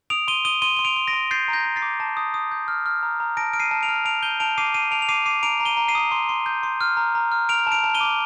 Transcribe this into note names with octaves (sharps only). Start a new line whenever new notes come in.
D#6 D7 F7
C6 D#7 G7
D#6 D#7 G7
C6 D#7 G7
C6 G7
D7 F7
C6
A#6 D7
C6
G6 A6 C7
A#5
G6 A#6
G6
A6 C7
D6
A5
D#6
D#6
G6
F6
F6
A#5
A#5
A5 A#6 D7
F6 D7
C7 D#7
A5
D7 F7
F6
A5 D7 F7
G6 D#7 G7
A5 D7 F7
D6 C7 D#7
A5 C7 D#7
A5 D7 F7
F7
D6 C7 D#7
D6 C7 D#7
A#5 D7 F7
A#5
D#7 G7
A#5
C7 D#7
D#6
C6
C6
G6
C6
F6
A#5
A#5
F6
F6 D7 F7
A5
D7 F7
A5
D#7 G7
D6